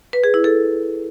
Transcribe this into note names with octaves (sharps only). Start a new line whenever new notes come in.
B4
G#4
E4
A4